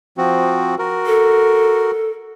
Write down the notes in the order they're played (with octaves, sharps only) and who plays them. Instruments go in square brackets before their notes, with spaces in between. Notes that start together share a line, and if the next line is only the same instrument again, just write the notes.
[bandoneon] F3 C4 F#4
F#4 A#4
[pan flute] A4